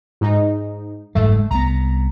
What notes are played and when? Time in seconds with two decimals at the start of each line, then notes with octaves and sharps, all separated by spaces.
0.21 G#2 D#4
1.15 F#1 G#2 G#3 A3
1.51 C2 B3 A#5